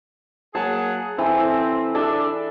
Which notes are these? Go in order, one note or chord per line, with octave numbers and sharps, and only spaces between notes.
F#3 A#3 G#4 F#5 A5
E3 C4 A4
D4 A4 D5 E5